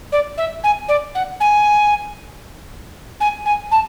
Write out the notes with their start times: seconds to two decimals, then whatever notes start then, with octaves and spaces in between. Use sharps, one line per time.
0.12 D5
0.37 E5
0.64 G#5
0.88 D5
1.15 F#5
1.40 G#5
3.20 G#5
3.45 G#5
3.71 A5